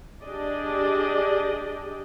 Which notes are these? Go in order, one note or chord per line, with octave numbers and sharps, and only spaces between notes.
D4 G4 G#4 D5 D#5